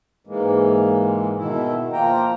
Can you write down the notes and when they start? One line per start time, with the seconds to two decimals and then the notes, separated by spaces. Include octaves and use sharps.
0.27 G#2 E3 G#3 A#3
1.37 B2 D#3 E4
1.93 F3 A#3 F4 G5 A#5